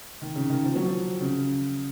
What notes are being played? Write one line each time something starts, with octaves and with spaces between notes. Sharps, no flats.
D#3
C#3
D#3
F3
F#3
F3
C#3